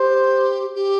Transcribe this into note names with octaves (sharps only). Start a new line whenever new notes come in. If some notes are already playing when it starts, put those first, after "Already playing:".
Already playing: G4 C5
G4